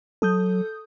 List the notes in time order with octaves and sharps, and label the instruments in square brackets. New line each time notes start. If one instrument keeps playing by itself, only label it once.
[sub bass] F#3 [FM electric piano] A4 D#6 G6